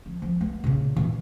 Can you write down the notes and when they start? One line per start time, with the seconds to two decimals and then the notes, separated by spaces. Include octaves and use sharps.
0.06 F3
0.22 F3
0.41 A3 B3
0.64 A#2 C#3
0.96 A#2 E3